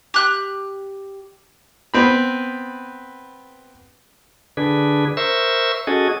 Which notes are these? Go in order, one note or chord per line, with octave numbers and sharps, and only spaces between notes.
G4 F#6
B3 C4 B5
D3 D4 G#4 B4
A#4 C5 E5 C#6 E6
C#4 F#4 G#4 A4 D#5